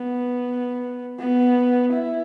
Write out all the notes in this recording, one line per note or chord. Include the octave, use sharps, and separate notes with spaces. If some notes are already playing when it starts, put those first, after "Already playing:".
Already playing: B3
B3
E4